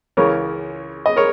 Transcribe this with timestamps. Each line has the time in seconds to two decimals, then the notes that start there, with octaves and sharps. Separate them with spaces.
0.17 C#2 C#3 E3 A#4 C#5
1.06 D#5
1.16 A#4 C#5